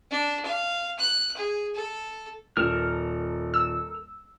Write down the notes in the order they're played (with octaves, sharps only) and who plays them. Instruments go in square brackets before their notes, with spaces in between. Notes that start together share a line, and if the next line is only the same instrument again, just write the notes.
[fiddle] D4
F5
F#6
G#4
A4
[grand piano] D#1 [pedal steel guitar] A4 A#4 F6
[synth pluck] E6